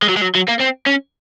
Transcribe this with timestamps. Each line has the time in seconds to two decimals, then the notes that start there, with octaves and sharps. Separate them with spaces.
0.02 G#3
0.09 F#3
0.17 G#3
0.22 F#3
0.35 F#3
0.49 A#3
0.60 C4
0.87 C#4